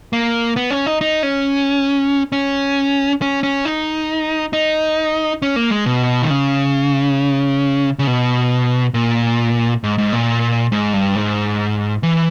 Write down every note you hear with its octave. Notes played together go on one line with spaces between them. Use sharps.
A#3
B3
C#4
D#4
D#4
C#4
C#4
C#4
C#4
D#4
D#4
C#4
A#3
G#3
B2
D#3
C#3
C#3
B2
A#2
G#2
G#2
A#2
G#2
G2
G#2
E3